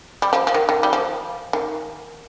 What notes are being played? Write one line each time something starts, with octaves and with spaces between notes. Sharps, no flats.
G3
F3
F3
D#3
D#3
G3
F3
D#3